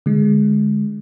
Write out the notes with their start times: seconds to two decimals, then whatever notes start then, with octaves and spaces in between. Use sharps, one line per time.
0.06 D3 G#3